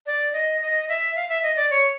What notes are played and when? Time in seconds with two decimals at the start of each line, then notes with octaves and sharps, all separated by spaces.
0.06 D5
0.33 D#5
0.61 D#5
0.89 E5
1.16 F5
1.29 E5
1.43 D#5
1.56 D5
1.71 C#5